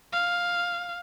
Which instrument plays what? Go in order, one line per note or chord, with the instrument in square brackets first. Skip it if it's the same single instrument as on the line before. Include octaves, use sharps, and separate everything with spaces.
[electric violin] F5